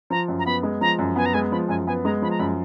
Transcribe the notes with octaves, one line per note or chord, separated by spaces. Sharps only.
F3 A#5
F#2
A#5
B3 B5
G#3
F3 A#5
F#2
B3 G#5
A#5
G#3 G#5
F3 B5
F#2 G#5
B3 G#5
G#3 A#5
F3 B5
A#5
F#2 B5